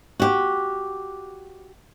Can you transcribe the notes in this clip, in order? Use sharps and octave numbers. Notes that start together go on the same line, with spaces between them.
F#4 G4